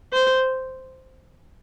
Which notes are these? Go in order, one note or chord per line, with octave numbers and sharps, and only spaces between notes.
C5